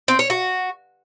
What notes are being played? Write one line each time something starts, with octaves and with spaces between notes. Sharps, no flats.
C4
C#5
F#4